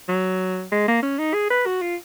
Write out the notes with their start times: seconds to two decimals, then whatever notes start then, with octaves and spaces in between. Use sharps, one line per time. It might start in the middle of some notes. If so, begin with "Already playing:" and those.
0.09 F#3
0.72 G#3
0.88 A#3
1.03 C#4
1.19 D#4
1.34 G#4
1.51 B4
1.66 F#4
1.82 F4